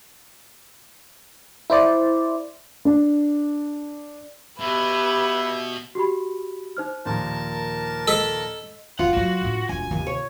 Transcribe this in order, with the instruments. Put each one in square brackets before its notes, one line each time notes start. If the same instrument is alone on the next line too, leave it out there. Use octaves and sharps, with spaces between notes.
[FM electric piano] E4 C5 D5
[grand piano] D4
[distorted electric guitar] B2 [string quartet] G4 E6 G#6 [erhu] B4 [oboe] E5
[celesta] F#4 G4 B5
D#4 C5 F6
[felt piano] D#2 A#2 F3 [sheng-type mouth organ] A#4 A5
[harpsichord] A4 [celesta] D#5 B6
[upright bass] E1 [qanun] F4 [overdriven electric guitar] F#5
[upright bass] F3 F#3 [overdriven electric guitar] F#4
[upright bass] A2 D3
[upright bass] E1 [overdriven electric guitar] G#5
[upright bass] D#2 C3
[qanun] C#5